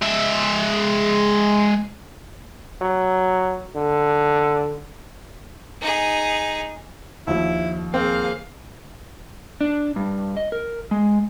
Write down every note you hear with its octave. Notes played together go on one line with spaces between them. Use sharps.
G#3 E5
F#3
D3
D#4 G#4
D#2 F3 E4
A#3 C4 G#4 F5
D4
G2
D#5
A#4
G#3